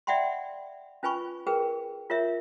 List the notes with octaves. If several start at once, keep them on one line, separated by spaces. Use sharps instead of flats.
D5 E5 F#5 G5 B5 C6
C#4 F4 B4 G#5 B5 C#6
G#4 A#4 B4 G5
F4 A#4 C#5 E5